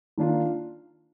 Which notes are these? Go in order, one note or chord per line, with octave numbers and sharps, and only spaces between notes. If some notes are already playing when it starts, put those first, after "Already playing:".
D#3 A#3 D4 F4